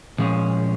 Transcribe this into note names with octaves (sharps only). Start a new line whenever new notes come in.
A#2 F3 G#3 C#4